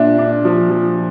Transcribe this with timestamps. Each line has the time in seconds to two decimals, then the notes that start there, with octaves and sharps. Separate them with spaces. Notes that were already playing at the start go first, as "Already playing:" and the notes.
Already playing: A#2 D4 E5
0.18 D4
0.45 F3
0.70 F3